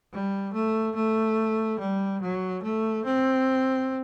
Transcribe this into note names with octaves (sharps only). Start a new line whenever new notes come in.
G3
A3
A3
G3
F#3
A3
C4